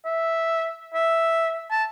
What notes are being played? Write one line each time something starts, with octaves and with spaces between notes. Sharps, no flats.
E5
E5
A5